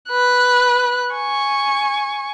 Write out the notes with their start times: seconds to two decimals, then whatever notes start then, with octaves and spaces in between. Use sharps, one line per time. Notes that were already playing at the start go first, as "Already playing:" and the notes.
0.10 B4 F#6
1.14 G#5 C#6